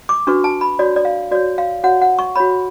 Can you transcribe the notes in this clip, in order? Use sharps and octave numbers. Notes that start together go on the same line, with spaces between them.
D6
D4 F#4 B4 C#6
A5
B5
F#4 C#5 D5
D5
F5
F#4 C#5 D5
F5
F#4 C#5 F#5
F#5
C#6
F#4 C#5 B5